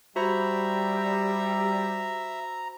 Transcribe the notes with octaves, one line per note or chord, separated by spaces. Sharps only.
G3 F#4 C5 E5 A#5 B5